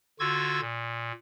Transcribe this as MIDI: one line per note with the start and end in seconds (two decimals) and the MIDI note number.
0.20 0.60 50
0.20 0.60 65
0.20 0.60 66
0.20 0.60 85
0.20 0.60 88
0.20 0.60 92
0.60 1.12 46